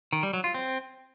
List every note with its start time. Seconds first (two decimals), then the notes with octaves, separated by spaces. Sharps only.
0.13 D#3
0.23 G3
0.33 F#3
0.44 F4
0.54 C4